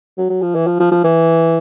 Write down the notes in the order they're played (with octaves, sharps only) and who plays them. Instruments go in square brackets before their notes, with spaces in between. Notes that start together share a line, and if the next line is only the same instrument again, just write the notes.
[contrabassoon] F#3
F#3
F3
E3
F3
F3
F3
E3